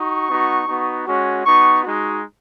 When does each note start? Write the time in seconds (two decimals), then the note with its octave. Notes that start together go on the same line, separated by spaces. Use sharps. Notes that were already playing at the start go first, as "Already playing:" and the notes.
Already playing: D#4 F#4 C#6
0.28 B3 D#4 F#4
0.67 B3 D#4 F#4
1.06 G#3 C#4 F#4
1.44 B3 D#4 F#4 C#6
1.83 G#3 D#4 F#4